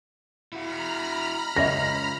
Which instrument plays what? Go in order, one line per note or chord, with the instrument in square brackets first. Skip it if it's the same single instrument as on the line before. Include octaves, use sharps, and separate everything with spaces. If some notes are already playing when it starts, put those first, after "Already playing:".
[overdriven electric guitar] E4 F#4 [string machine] A#5 B5 F6
[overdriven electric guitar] C#2 [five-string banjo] C#4 D#5 E5 [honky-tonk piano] A#6